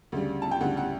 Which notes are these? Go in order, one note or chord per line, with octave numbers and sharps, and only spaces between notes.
D2 C#3 G3
A5
G5
D2 C#3 G3 F#5
F#5